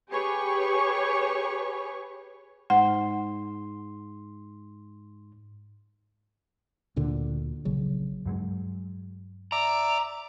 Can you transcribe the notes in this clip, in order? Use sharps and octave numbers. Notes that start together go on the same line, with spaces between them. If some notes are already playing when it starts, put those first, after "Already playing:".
G4 G#4 B4 C#5 C#6
G#2 F#5 C6
D2 A#2 D3
A#1 C#3 F#3
G2 F#3 G#3
D5 E5 A#5 D6